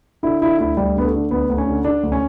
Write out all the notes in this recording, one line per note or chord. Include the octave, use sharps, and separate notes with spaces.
D3 E4
D3 E4
D2 E4
D2 G3
D3 B3
A3
D3
D2 B3
D2
C#4
D3
D3 D4
D2
C#4